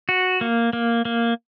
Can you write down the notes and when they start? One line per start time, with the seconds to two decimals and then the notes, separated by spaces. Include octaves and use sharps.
0.09 F#4
0.41 A#3
0.73 A#3
1.05 A#3